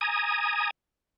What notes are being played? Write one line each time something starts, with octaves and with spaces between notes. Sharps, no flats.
G#5 A#5 D#6